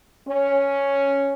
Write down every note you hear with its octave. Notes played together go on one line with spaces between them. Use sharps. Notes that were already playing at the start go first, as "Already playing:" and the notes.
C#4